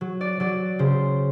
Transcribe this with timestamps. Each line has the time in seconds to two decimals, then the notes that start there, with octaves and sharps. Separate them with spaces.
0.01 F#3
0.21 D5
0.40 F#3 D5
0.79 C#3 C5